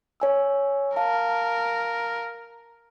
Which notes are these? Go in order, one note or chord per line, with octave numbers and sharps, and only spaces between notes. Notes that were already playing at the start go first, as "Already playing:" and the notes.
C#5 G#5 E6
A#4 F5 A5